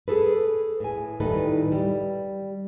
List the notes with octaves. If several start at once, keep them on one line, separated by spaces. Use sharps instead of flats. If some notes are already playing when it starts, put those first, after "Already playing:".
G#4 A4 B4
A2 G#5
A2 D#3 G3 D#4 A4 B4
G3